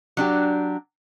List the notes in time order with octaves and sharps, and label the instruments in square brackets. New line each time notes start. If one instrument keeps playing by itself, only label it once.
[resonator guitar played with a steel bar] F#3 D4 G4